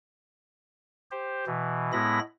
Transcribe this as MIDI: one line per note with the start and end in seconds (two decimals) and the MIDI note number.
1.11 1.45 67
1.11 1.45 72
1.47 1.92 47
1.47 1.92 52
1.93 2.20 45
1.93 2.20 56
1.93 2.20 59
1.93 2.20 64
1.93 2.20 83
1.93 2.20 94